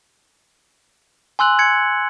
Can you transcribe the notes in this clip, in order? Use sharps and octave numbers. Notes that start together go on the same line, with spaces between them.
G#5 C6 E6 F#6 F#7
G#6 C#7